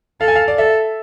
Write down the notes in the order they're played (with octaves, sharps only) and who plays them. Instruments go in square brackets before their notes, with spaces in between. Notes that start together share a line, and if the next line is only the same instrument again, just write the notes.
[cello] A4 [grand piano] F5
[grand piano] G#5
F5
D5
[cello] A4 [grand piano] E5